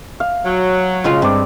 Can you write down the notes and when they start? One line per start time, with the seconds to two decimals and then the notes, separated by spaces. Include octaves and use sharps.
0.20 F5
0.45 F#3
1.04 B1 C#3 G#3 F4
1.22 G2 C4 D5